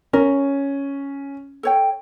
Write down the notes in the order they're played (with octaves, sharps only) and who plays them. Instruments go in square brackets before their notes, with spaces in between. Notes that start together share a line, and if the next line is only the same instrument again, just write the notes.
[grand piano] C#4 [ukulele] A#4
[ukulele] A4 C#5 G5